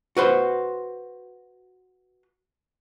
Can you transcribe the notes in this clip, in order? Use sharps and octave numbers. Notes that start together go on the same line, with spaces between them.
F#4 B4 C5